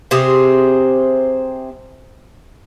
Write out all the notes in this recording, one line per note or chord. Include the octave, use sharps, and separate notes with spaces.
C3 C4 G#4